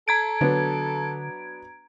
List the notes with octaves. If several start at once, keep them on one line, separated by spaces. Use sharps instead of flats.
A4 A#5 G#6 D7
D3 F#3 B3 D4